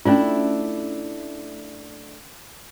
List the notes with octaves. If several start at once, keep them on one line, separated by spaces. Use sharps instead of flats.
A3 C#4 D4 E4 F4